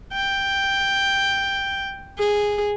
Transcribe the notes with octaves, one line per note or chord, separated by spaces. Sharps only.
G5
G#4